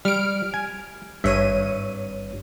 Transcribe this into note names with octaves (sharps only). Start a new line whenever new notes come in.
G3 F6 D7
G#5
G#1 G2 C#5 E5 D#7